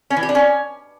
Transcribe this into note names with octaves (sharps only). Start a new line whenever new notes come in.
C#4
E3
G4
D4
C#4